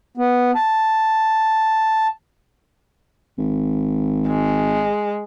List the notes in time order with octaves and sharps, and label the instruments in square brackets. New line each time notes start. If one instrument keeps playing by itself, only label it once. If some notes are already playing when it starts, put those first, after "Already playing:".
[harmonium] B3
A5
[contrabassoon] G#1
[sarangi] G#3